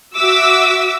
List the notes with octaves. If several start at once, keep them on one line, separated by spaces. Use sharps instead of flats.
F#4 E5 D6 E6